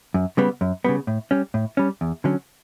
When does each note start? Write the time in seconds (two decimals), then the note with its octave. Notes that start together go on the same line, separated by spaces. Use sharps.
0.14 F#2
0.37 C#3 G3 B3
0.61 F#2
0.84 C#3 G3 B3
1.07 A2
1.31 G3 C#4
1.54 A2
1.77 G3 C#4
2.01 E2
2.24 D3 F#3 C#4